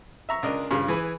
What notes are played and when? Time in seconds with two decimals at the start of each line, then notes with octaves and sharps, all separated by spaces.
0.29 E5 A#5 C#6
0.43 C#2 D4 A#4 D#5
0.71 G2 C#3 F4
0.88 E3 G#4 B4 G#5